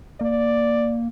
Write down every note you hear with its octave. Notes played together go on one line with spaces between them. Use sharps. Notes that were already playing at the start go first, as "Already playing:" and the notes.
A#3 D5